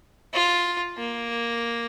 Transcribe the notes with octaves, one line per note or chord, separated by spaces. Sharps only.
F4
A#3